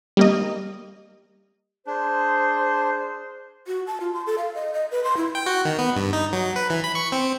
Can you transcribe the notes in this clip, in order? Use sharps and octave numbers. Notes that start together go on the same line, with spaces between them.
G3 A#3 D#5
D4 G#4 C5
F#4
A5
F4
C6
A4
F5
D#5
D#5
B4
C6
E4
G5
F#4
D#3
B3
G2
D#4
F#3
B4
E3
B5
C#6
C4